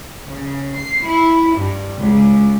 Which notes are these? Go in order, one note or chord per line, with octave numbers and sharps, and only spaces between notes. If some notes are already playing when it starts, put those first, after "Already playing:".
C#3
C7
E4
G2
C#2